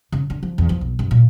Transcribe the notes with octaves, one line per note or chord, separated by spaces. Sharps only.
C#3
D3
F3
E2
F3
B1
F#2
A#2